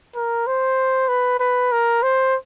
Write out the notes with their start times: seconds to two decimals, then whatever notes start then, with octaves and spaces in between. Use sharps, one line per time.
0.15 A#4
0.47 C5
1.09 B4
1.40 B4
1.72 A#4
2.03 C5